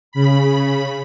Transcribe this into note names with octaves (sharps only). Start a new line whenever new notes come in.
C#3 B5